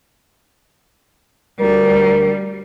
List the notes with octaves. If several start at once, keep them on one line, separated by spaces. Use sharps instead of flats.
D2 G3 A#4